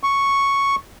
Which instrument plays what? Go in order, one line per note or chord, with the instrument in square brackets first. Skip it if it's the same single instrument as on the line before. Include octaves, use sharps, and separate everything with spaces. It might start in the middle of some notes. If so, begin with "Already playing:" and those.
[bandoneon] C#6